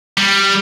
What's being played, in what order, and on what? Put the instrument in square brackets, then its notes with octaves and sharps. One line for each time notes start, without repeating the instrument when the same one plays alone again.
[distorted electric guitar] G3